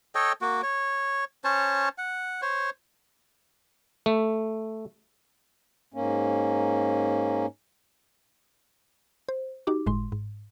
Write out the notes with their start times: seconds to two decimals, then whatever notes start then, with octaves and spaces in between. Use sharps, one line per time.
0.15 A4 C#5 D#5 G5
0.41 A#3 F#4
0.63 C#5
1.44 C#4 C5 C#5 A5
1.98 F#5
2.42 C5 C#5
4.06 A3
5.94 G#2 A#3 C#4
9.29 C5
9.67 D#4 F#4 G4 D6
9.86 G1 A2 G#3 C6
10.12 G#2